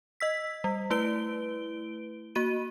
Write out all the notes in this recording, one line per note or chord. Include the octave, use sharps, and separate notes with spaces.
D#5 E6 B6
G3
A3 E4 B4 D7 G7
A#3 F#4 D#7